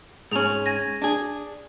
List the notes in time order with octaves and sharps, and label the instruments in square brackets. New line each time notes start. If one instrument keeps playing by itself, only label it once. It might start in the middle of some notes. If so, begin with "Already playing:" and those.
[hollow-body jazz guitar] G#2 C#4 [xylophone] G#4 F7
[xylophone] G#5 G#6 A#6
[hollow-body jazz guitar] D4 G#4